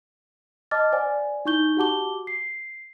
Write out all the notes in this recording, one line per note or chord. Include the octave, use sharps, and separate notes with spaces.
D#5 A5 D6 F6 A6
C5 D5 F#5 G#5
D#4 E4 C#6 G6 G7
F#4 G4 F#5 A5 D6 G7
C7